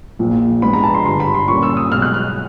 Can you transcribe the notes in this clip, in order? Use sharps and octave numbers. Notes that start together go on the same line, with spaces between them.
A#1 A#2 F3
G#2 F3 G#3 B3 D4 B5
A#5
A5
C6
G1 G2 D3 G3 C6
B5
C6
A#2 G3 A#3 C#4 C#6
E6
D#6
B1 B2 G#3 F6
F#6
F6